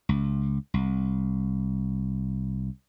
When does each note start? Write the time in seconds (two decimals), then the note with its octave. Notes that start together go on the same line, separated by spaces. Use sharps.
0.09 C#2
0.74 C2